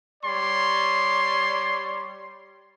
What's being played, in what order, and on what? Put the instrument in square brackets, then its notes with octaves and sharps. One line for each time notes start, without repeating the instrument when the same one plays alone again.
[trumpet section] G3 C#5 D5 C6